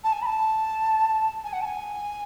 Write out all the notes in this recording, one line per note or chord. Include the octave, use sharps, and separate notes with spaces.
A5
G#5
B5
A5
G#5
F#5
A5
G#5